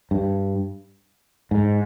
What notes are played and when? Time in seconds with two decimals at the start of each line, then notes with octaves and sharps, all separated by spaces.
0.11 G2
1.51 G#2